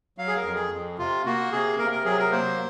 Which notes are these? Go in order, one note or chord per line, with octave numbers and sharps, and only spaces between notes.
F#3 F5
G#4
A#4
F2
G#4
F2
C3 F4
A#3 F#4
C3 G#4
C3 A#4
A#4
F#3 G#4
A#4
A#3 C5